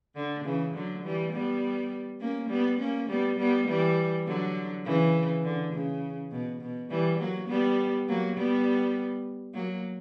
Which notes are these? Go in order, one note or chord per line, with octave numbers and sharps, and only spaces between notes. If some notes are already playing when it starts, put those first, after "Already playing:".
D3
C#3 E3
D3 F#3
E3 G3
G3 B3
A#3 C#4
G3 B3
A#3 C#4
G3 B3
G3 B3
E3 G3
D3 F#3
C#3 E3
D3
C#3
B2
B2
E3 G3
F#3 A#3
G3 B3
F#3 A#3
G3 B3
F#3 A#3